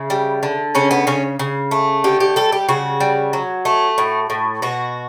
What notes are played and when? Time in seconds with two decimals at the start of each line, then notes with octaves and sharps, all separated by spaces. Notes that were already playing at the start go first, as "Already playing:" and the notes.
Already playing: C#3 E4
0.10 G3
0.43 D3
0.75 C#3 C#4
0.91 B3
1.07 C#3 C#4
1.39 C#3
1.71 A3
2.04 D3 G4
2.20 G4
2.36 G3 A4
2.52 G4
2.69 C#3 F#4
3.00 G3
3.33 F#3
3.65 A3
3.98 A2
4.30 A2
4.62 B2 F#4